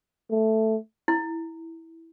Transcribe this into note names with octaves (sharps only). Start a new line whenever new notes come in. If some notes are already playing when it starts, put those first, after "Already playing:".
A3
E4